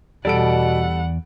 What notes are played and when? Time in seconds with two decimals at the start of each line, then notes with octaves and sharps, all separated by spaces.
0.25 E2 B2 G3 A4 D5 F#5 D7